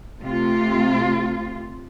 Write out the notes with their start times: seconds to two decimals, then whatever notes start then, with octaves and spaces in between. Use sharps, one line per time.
0.22 C3 A3 F4